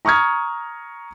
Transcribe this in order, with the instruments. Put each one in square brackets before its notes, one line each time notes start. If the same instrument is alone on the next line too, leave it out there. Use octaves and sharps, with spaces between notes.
[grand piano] A#5 C#6 D#6 F6 G#6